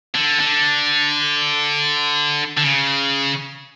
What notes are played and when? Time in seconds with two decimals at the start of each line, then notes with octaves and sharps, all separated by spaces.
0.15 D3
0.40 D3
2.58 D3
2.64 C#3